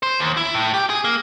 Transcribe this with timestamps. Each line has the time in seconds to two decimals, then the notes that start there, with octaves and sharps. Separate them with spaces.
0.03 C5
0.19 D#2
0.37 E4
0.54 A2
0.74 G4
0.90 G#4
1.04 A#3